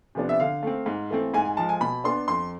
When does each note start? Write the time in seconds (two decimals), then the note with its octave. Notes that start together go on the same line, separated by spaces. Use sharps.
0.15 C3 F3 B3 D4
0.29 E5
0.40 D3 F5
0.63 A3 C4
0.86 G#2
1.10 E3 A3 C4
1.34 G#2 G#5
1.45 G#5
1.57 F3 G#3 A5
1.69 G#5
1.81 B2 B5
2.04 B3 D4 C6
2.28 F2 C6